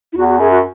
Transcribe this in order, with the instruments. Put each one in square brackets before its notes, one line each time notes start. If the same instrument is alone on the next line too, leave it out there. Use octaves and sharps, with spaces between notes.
[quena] E4
[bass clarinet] E2 [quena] F#4
[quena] F#4
[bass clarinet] F#2 [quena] G#4
[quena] F#4